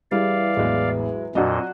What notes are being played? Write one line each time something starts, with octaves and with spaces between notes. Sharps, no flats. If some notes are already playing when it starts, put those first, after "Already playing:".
E3 G3 E4 G#4 D5 F5
A1 E2 F#3 G#3
F2 A#2 F#3 D4 F#4 D#5